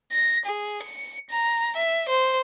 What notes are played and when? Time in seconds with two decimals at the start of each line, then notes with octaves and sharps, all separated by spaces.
0.12 A#6
0.46 G#4
0.83 C#7
1.30 A#5
1.77 E5
2.09 C5